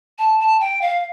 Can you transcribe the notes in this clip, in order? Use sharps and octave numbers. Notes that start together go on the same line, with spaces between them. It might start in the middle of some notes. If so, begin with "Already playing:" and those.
A5
A5
G5
F5